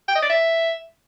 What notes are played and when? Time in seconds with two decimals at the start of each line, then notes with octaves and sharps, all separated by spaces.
0.08 G5
0.15 D#5
0.23 D5
0.30 E5